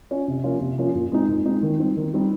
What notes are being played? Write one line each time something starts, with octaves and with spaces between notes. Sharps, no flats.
C#4 F4
C3
F3 A#3 C#4 F4
C3
F3 A#3 C#4 F4
A#2
G#3 C4 D#4
A#2
G#3 C4 D#4
D#3
G3 C4 D#4
D#3
G3 C4 D#4